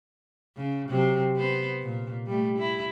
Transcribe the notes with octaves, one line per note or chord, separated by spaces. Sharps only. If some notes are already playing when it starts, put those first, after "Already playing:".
C#3
C3 F#3 C4
B3 C5
A#2
G3 A3
E4